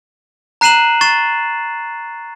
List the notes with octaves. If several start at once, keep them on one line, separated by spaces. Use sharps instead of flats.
A#5 F#6 C7 D#7 E7 F#7
C#6 A6 C7 E7